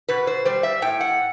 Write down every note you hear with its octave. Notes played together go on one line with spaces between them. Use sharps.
B2 B4
C5
G3 C5
E5
A2 G5
F#5